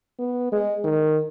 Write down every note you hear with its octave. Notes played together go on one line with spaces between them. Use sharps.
B3
G#3
D#3